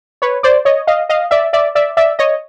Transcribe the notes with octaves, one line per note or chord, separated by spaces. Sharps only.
B4 C#5
C5 D5
C#5 D#5
D#5 F5
D#5 F5
D5 E5
D5 E5
D5 E5
D5 E5
C#5 D#5